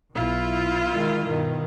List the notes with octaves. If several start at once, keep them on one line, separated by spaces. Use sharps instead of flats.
B1 E4 F4
D#3 G#3
G2 B2 D#3